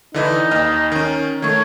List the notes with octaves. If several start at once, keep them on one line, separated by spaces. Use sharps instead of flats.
D3 E3 D#4 B4
D#2 D#5 F6
D#3 C#4
D#3 A3 C#5